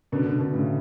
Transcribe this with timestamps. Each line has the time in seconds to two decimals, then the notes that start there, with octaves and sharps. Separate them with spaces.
0.12 B2 D3
0.26 B2 D3
0.40 B2 D3
0.53 A2 C#3